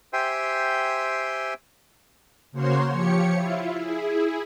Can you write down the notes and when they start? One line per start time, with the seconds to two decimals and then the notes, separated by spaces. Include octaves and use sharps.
0.13 G4 C5 E5 G5 G#5 C6
2.52 C#3 A#3 F#4 C5 C#5 C6
2.91 F3 G4 C#5 C#7
3.32 E4 F4
3.76 E4 G#4